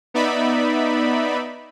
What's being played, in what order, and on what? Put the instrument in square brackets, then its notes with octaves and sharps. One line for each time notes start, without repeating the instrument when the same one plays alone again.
[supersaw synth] B3 D#4 D5 E5 B5